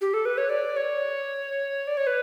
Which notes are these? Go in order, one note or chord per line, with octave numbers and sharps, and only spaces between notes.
G4
A4
B4
C#5
D5
C#5
D5
C#5
B4